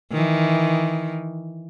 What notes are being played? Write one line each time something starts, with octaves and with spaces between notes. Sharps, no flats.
D#3 E3